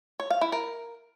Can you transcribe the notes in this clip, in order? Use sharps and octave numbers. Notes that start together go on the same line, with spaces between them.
C#5
F5
E4
A#4